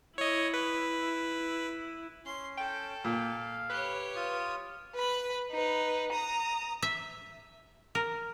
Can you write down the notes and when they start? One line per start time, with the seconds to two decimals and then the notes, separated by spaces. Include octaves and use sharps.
0.18 E4 C#5 D#5
0.54 B4
2.25 C#4 C6
2.57 A4 G5
3.04 A#2 F5
3.70 G4 B4 C#5
4.16 F4 D#6
4.94 B4 B5
5.51 D#4 B4
6.12 A#5 D#6
6.82 E5
7.95 A#4